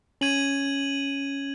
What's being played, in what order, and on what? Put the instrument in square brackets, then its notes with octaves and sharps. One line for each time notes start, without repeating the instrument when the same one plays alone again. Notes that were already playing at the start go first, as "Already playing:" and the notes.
[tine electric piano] C#4 [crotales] G#6 D#7 F#7